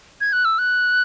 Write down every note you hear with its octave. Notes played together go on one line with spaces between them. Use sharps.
G#6
F#6
E6
F#6